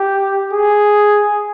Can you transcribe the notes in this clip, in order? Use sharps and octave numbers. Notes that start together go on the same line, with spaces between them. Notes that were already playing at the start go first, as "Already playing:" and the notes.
Already playing: G4
G#4